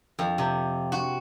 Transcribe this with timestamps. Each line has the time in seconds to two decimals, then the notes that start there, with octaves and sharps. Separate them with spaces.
0.19 F2
0.38 C3
0.92 F#4